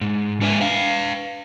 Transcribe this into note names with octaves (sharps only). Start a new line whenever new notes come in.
G#2
G#3 D4 B4 E5 G#5
B4 F5